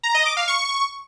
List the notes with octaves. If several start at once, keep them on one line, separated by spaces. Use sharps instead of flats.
A#5
D#5
D6
F5
C#6